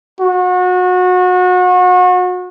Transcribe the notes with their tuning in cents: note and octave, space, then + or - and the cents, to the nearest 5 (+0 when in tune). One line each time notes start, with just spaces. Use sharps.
F#4 -30